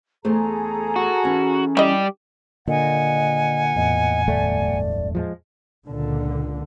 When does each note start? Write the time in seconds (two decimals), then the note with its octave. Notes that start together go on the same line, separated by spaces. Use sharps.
0.25 E2 A3 G#4 A4 C5 A#5
0.96 F#4
1.24 E3 C#4 A5
1.77 G3 E4 G4 D#5
2.68 A#2 D3 D#5 F#5 G#5
3.76 E2 A2 D#5
4.28 D1 G1 A3 D5
5.15 F3 G3 G#3
5.88 C#2 A#2 D3